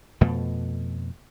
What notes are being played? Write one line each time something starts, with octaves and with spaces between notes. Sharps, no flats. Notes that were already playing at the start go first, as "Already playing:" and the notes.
F2 B2 A3